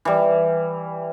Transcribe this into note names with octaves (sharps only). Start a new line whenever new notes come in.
E3 G3